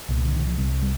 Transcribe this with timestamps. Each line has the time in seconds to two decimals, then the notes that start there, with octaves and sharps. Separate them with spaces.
0.09 C2 A#2
0.24 D3
0.36 D#3
0.47 F3
0.57 C2 C3 G3
0.82 G3